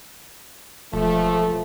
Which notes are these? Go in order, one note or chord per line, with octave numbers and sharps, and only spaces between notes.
E1 F3 A3